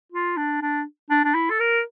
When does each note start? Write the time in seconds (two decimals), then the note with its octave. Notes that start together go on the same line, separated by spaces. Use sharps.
0.12 F4
0.37 D4
0.62 D4
1.10 D4
1.25 D4
1.35 E4
1.50 A4
1.60 A#4